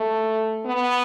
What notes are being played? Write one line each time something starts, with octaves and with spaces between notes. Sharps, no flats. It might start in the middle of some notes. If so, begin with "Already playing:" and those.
Already playing: A3
B3